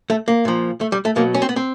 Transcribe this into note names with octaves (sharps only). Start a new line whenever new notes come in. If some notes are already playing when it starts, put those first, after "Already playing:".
A3
A#3
A#2 F3
A3
G3
A3
B2 F#3 A#3
C#4
C4
B3
C4